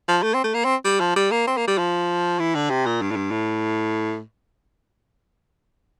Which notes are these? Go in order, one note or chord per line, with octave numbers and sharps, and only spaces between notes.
F3
A3
C4
A3
A#3
C4
G3
F3
G3
A#3
C4
A#3
G3
F3
E3
D3
C3
A#2
G2
A2
G2
A2